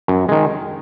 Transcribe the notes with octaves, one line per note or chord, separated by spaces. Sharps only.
F#2
D#3 G#3